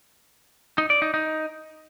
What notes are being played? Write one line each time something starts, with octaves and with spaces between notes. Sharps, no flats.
D#4
D5
D#4
D#4